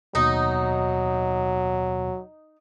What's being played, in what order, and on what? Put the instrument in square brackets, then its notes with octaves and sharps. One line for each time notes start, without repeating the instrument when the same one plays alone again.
[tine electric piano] D#2 B2 [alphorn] F#3 [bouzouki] D#4